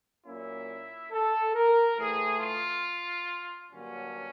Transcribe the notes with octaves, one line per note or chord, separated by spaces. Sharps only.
A#2 F#3 A#3 C#4 E4
A4
A#4
A2 E3 A3 G#4
F4
G2 D3 F#3 A#3 C#4